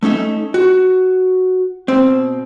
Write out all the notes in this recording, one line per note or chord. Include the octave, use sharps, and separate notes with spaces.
A3 C#4 D#4 E5
F#4
B2 C4